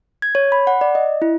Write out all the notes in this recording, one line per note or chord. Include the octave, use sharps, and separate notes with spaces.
G#6
C#5
B5
F#5
D5
D#5
E4